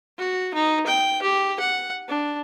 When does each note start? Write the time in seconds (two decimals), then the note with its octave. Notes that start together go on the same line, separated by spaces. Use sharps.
0.18 F#4
0.54 D#4
0.86 G5
1.22 G4
1.60 F#5
2.08 D4